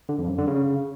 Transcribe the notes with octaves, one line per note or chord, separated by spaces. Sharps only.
D3
F2
F#2
D3
C#3